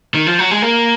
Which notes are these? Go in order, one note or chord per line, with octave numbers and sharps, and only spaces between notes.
D#3
F3
F#3
G#3
A#3